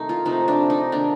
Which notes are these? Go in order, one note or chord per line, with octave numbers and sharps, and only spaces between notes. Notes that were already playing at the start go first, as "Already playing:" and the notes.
Already playing: C3 D#3 A3 D#4
F4
C3 F3 A3 D#4
D4
D#4
D#3 A#3 D4